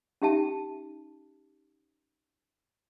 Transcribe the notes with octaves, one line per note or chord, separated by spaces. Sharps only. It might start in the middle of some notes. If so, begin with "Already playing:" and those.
C#4 D#4 G4 E5 G5 A5